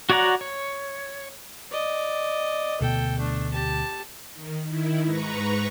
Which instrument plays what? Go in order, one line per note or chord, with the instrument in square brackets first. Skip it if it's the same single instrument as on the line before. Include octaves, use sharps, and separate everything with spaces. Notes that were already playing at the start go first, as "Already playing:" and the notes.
[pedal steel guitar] F#4 C#5 D5 F#5 A#5
C#5
[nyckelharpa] D5 D#5
[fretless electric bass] D2 B2 B3 [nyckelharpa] A4 G5
[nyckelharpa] A3 D4
G4 A5
[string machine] D#3
D#3 E4
G#2 B4 A#5 C#6